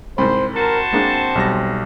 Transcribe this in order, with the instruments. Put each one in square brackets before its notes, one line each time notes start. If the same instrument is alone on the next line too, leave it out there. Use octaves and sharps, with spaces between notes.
[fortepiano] C2 G#2 [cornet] C5 [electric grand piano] B5
[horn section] F#4 C5 A5 [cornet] A#4
[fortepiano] G#3 A#3 D4 [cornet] C4
[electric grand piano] B1 G3 A#6